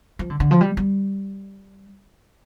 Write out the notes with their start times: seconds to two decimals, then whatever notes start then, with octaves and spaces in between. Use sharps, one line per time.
0.19 F3
0.30 D3
0.40 D3
0.51 F3
0.61 G3
0.77 G3